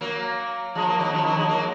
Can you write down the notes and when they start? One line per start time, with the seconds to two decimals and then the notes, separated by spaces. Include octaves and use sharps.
0.01 F#3 A#3
0.75 F3 G#3
0.87 F#3 A#3
0.99 D#3 F#3
1.12 C#3 F3
1.24 D#3 F#3
1.36 F3 G#3
1.48 F#3 A#3